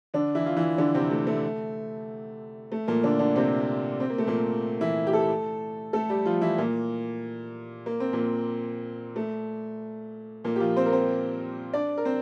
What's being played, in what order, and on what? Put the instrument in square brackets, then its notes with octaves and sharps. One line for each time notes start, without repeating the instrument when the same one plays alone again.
[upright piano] D3 D4
E3 E4
F4
E3 E4
D3 D4
C3 C4
A3
A3
A3
A#2 A#3
D3 D4
D3 D4
C3 C4
C4
A#3
A3
A#2 A#3
E3 E4
G4
A3 A4
A3 A4
G3 G4
F3 F4
E3 E4
A#2 A#3
A#3
C4
A#2 A#3
A3
A#2 A#3
G4
F3 F4
C4 C5
A#4
C4 C5
D4 D5
A#4
C4 C5